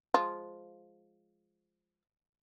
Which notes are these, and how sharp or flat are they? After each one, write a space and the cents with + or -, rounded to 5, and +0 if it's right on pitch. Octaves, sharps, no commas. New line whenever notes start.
F3 +0 G#3 +0 F4 +0